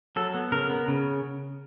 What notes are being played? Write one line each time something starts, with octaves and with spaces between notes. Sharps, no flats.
F#3 A4
B3
C#3 A#4
B3
C#3